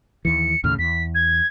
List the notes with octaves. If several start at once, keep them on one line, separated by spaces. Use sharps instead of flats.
D#2 E3 C#7
D#2 A2 C#3 F6
E2 B6
G#6